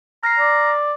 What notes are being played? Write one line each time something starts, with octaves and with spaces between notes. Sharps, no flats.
A#5 F6 A#6 C7
D5